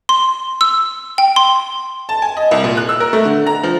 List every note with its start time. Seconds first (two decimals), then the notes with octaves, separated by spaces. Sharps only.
0.09 C6
0.61 E6
1.18 G5
1.36 C6
2.09 A5
2.22 G#5
2.37 D#5
2.51 C2
2.64 A#2
2.77 F#6
2.89 E6
3.00 A#4
3.13 A3
3.25 D3
3.46 A#5
3.63 F3